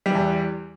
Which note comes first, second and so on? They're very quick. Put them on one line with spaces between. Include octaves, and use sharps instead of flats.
G3 E3 E2